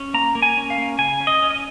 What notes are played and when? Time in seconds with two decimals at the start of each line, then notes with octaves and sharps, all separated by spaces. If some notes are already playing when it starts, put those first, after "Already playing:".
Already playing: C#4
0.14 A#3 A#5
0.35 A#3
0.42 G#5
0.57 C#4
0.70 F5
0.78 A#3
0.99 C#3 G#5
1.20 C#4
1.27 D#5
1.42 C#4
1.51 D#5